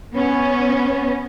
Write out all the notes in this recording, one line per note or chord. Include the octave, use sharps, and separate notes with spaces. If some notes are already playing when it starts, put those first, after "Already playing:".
B3 C#4